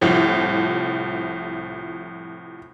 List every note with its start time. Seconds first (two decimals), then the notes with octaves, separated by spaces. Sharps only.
0.01 C2 A2 F3